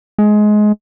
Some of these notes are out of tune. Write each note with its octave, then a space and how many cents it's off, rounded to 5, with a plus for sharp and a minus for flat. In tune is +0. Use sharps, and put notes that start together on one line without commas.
G#3 +20